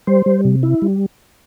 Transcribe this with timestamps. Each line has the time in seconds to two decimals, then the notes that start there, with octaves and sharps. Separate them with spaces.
0.07 G3 C5
0.26 G3
0.45 C3
0.63 E4
0.82 G3